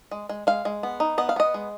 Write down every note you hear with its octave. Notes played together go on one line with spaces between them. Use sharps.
G#3
G#3
G#3 F5
G#3
B3
D#4
B3 D#5
F5
B3 D#5
G#3